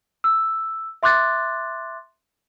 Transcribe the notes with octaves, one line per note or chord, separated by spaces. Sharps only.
E6
E5 C6 D6 F#6 A6